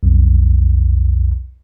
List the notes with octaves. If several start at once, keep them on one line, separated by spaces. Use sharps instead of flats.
B1 F2